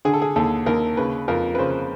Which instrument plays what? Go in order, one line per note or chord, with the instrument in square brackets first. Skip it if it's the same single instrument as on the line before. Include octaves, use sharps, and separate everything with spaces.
[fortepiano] D3 G#4
A4
G#4
D#2 A4
D#2 A#4
C#3 B4
F2 A#4
B4
C#3 C5